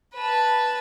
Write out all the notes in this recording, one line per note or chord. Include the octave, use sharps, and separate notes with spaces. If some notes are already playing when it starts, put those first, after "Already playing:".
B4 A5